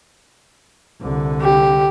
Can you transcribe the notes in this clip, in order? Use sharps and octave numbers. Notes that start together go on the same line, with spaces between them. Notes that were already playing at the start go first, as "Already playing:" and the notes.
C2 D3
G4